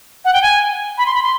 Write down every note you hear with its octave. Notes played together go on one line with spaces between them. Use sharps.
F#5
G5
G#5
B5
C6
B5
C6